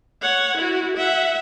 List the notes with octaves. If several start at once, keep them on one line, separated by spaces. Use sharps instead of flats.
C#5 F#5
E4 F#4
E5 F#5